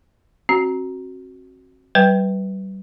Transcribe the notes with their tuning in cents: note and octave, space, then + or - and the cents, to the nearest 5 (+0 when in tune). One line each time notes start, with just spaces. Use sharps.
C4 +35 F#4 +0
G3 -35 B4 +0 G5 +0